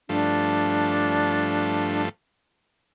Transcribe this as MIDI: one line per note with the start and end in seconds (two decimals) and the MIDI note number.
0.09 2.09 43
0.09 2.09 53
0.09 2.09 57
0.09 2.02 62